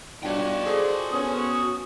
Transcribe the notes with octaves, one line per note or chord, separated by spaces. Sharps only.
B1 G2 D#4 F4 F#4 C#5 D5 G5
G#4 A4 C5
B3 C#4 D#6